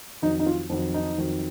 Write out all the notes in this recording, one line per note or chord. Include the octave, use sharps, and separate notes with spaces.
F2 D#3 F#3 D#4
D#4
F4
F2 D#3 F#3
D#4
F2 D#3 F#3